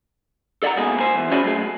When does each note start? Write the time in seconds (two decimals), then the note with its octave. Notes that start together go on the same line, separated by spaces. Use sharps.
0.63 A4 D5 E5 F#5 A#5
0.77 G#2 B2 A#3 G#4
1.00 C5 G#5
1.15 E2
1.31 C#4 E4 F#4 G#4 D5 G#5
1.44 F#3 A3 G#4